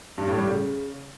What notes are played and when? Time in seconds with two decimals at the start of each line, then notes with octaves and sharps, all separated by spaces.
0.18 G2
0.28 A2
0.37 G3
0.47 C#3